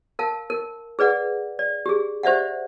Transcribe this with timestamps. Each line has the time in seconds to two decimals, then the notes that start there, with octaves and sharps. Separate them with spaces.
0.19 A#4 F5 A5
0.50 A#4
0.99 G#4 B4 D5 F#5
1.59 D5
1.86 G4 G#4
2.23 G4 C5 D5 E5 F#5